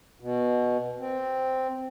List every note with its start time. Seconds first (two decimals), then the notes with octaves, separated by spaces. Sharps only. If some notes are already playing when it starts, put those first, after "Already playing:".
0.20 B2
0.99 C4